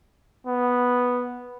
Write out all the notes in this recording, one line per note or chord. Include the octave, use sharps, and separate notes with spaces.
B3